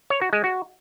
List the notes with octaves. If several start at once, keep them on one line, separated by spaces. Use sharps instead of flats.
C#5
F#4
G#3
F#4